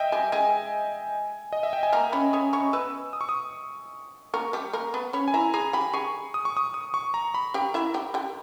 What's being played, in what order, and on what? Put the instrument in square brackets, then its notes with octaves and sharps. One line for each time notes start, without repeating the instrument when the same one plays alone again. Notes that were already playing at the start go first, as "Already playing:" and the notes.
Already playing: [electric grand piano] D#5 E5 G5
[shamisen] G3 G4 [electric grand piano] G#5
[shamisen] G#3 G#4 [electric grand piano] G#5
[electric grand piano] D#5
E5
G5
G#5
[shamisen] A#3 A#4 [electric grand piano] A#5
[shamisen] C#4 C#5 [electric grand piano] B5
[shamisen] C#4 C#5 [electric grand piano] D#6
[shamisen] C#4 C#5 [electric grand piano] C#6
[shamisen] B3 B4 [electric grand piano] E6
[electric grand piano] D#6
C#6
D#6
[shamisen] A#3 A#4 [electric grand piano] C#6
[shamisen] G3 G4
A#3 A#4
B3 B4
[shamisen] C#4 C#5 [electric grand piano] B5
[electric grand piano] G#5
[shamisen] E4 E5 [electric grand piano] A#5
[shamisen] G#4 G#5 [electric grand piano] A#5
[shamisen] G4 G5 [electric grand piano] B5
[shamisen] G#4 G#5 [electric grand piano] C#6
[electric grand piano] D#6
C#6
D#6
D#6
C#6
A#5
B5
[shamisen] G4 G5
E4 E5
G4 G5
G4 G5